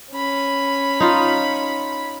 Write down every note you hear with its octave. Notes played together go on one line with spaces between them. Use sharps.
C#4 B5
D#4 F4